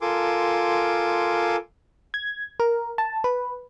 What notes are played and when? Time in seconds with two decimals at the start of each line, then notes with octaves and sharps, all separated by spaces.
0.01 F4 A4 A#4 G#5 C6 D6
2.14 G#6
2.60 A#4
2.98 A5
3.24 B4